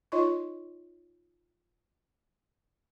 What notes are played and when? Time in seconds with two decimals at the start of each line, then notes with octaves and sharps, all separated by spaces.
0.12 D#4 F4 C#5 D#5 C6 C#6